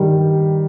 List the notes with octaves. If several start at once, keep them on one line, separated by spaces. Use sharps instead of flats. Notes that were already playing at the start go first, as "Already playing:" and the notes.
Already playing: G2 D#3 G3